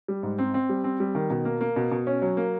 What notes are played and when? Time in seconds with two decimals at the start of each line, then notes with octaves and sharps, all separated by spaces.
0.08 G3
0.23 G#2
0.39 C4
0.54 C4
0.69 G3
0.84 C4
1.00 G3
1.15 D#3
1.30 B2
1.45 A#3
1.61 A#3
1.76 B2
1.91 B2
2.07 C#4
2.22 F#3
2.37 A#3